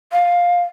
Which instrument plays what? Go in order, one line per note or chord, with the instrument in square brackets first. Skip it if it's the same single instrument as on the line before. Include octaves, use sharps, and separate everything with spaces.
[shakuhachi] F5